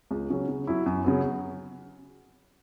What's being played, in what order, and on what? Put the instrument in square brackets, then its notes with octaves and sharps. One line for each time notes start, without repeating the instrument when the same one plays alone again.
[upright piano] C#2
C#3 F#3 C#4
C#3
F#3 C#4 E4
F#2
C#3 F#3 B3